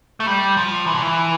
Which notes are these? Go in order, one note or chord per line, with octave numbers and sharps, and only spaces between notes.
A3
G3
F3
E3
D3
E3